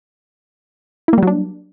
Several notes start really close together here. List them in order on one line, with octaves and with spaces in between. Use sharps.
E4 A#3 G3 F#3 D4